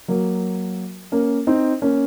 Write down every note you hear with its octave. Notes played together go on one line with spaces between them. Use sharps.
F#3 A#3
A#3 C#4
C4 D#4
A#3 C#4